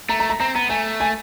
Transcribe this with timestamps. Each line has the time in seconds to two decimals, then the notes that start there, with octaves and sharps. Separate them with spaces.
0.09 A3 A#5
0.20 A#5
0.30 A#5
0.40 C4 A#5
0.55 B3 A#5
0.70 A3 G#5
1.00 G#5